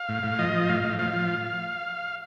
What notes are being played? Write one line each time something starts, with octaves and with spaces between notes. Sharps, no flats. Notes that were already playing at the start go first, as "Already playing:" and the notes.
Already playing: F5
A2
A2
F3 D#5
F3
A2 F5
A2
F3 F5
F3